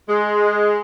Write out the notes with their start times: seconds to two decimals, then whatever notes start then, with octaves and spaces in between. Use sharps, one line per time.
0.09 G#3